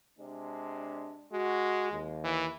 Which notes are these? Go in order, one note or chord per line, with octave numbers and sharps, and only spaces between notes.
C3 G#3 D4
G#3 F#4
D#2
E3